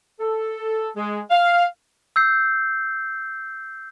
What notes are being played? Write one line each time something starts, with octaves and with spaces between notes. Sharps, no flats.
A4
G#3
F5
E6 G6 C7